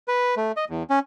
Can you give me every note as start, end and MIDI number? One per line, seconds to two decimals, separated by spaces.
0.08 0.35 71
0.37 0.52 57
0.56 0.65 75
0.70 0.83 40
0.90 0.99 61